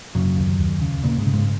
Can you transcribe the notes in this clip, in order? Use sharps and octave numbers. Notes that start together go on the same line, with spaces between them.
F#2 C#3 F#3
D#2
D#2
C#3
A#2 C#3 A#3
G#2 G#3
C#3
G#2 G#3